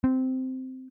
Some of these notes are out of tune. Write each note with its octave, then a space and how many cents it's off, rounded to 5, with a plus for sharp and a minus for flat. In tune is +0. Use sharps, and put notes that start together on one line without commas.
C4 -10